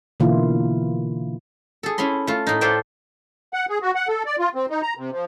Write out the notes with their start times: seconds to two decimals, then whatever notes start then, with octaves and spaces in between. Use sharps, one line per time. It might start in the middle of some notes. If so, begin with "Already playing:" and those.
0.20 B2 D3 E3 A#3 E4 F4
1.83 G#4 A4
1.98 C#4 E4 B5 C6
2.27 A3 F4
2.47 A2 D#4
2.61 F4 A4 C5 D5 E5 G5
3.54 F#5
3.69 G#4
3.82 F#4
3.95 F#5
4.08 A4
4.26 D5
4.39 F4
4.55 C4
4.70 D#4
4.82 A#5
4.97 C3
5.12 F3